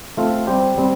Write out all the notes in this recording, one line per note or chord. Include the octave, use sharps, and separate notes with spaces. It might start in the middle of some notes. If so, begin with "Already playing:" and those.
A3 C4 F4 A4
G3 C4 G4 C5
G3 C4